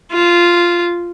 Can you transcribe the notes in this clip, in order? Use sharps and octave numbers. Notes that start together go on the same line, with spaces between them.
F4